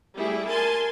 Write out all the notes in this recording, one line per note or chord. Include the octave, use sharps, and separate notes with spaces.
G3 A3 E4 G#4
A#4 G#5 A5 C6